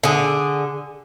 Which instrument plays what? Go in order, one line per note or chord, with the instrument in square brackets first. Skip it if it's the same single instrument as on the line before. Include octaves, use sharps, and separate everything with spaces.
[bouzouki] D3 G#4